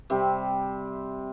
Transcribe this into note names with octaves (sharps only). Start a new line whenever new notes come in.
C3 G3 C4